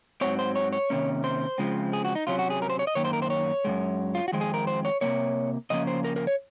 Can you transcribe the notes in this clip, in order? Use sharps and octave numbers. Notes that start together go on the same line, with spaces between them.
G#2 F#3 C4 C#5
C5
C#5
C#5
C3 D#3 A#3 C#4
C5
C#3 F3 G#3 C4
G#4
F#4
D#4
C3 F#3 C#4 F4
F#4
G#4
A#4
C5
C#5
D#5
F#2 D#3 A#3 C#5
C5
A#4
C5
C#5
F#2 C#3 G#3
F4
F#4
F2 D#3 G#3 C4
G#4
A#4
C5
C#5
C3 F3 A#3 C#5
C#3 F3 A#3 C#4 D#5
C5
A#4
A#4
C#5